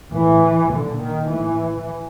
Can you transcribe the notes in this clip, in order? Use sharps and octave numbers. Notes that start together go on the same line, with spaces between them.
A2 E3
A#2 D3
D#3
A2 E3